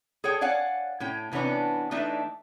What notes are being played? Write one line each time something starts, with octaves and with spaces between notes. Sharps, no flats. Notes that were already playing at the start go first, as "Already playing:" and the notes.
G#4 A4 C#5 G5
C#5 D5 F5 F#5 G#5
A2 C#4 G5
C3 E3 B3 C#4 D4
E3 A3 D4 D#4 E5